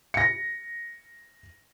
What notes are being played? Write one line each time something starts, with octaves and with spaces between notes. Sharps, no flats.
A#6 C#7